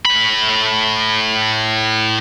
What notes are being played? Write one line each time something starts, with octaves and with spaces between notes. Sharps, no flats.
A2 B5